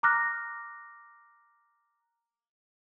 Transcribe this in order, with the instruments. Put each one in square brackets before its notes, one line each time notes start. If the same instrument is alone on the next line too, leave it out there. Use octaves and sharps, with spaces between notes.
[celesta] A#5 D6 F6 F#6 A#6